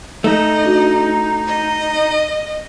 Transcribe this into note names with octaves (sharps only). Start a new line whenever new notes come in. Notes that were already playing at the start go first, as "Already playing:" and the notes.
A3 D#4 D#5
D4 F#4
D#5